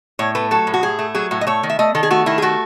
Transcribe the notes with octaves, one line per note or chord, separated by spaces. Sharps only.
A2 C#5
A3 B4
F#3 A4
A2
F#4
A2 G#4
A3
F#3 G#4
A2 F#4
D#5
A3 C#5
D#3
E5
A3 D#5
D#3 A4
G#4
A3 F#4
D#3 E4
G#4
A3 F#4